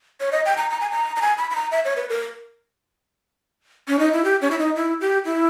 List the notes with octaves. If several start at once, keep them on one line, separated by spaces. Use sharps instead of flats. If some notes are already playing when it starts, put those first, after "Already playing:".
C#5
D#5
G5
A#5
A#5
G#5
A#5
A#5
G#5
B5
B5
A#5
E5
C#5
B4
A#4
C#4
D#4
E4
G4
C#4
E4
D#4
E4
G4
E4